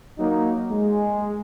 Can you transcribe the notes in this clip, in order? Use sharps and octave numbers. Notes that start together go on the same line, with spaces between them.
F#3 A#3 D#4
G#3